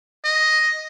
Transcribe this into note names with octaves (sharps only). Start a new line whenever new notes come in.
D#5